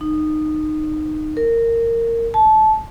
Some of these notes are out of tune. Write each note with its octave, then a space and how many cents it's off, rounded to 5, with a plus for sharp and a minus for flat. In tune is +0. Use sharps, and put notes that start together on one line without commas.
D#4 -15
A#4 -15
A5 -20